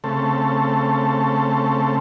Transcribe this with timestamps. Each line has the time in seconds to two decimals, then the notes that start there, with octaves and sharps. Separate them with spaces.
0.04 C#3 A3 C4 A4